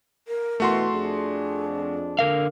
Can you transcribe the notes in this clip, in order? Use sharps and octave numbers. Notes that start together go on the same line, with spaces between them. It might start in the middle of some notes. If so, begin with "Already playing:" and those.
A#4
B2 E3 A3 F#4 C6
F2 D4 G#4
D3 A#4 F5